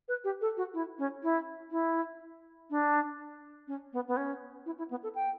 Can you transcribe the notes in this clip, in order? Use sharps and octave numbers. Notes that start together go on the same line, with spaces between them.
B4
G4
A4
F#4
E4
C#4
E4
E4
D4
C#4
B3
B3
C#4
E4
E4
B3
A4
G5